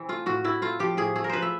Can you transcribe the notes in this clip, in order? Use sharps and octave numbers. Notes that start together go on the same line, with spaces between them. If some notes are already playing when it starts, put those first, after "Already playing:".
Already playing: C3 E3 C4
A3 F4
A2 F#4
A2 E4
A3 F4
F3 G4
A2 G#4
A3 G#4
A#4
F3 B4 C5
E5